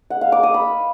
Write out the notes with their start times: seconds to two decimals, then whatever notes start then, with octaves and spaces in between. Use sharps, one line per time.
0.10 F#5
0.21 F5
0.32 D6
0.43 D#6
0.54 B5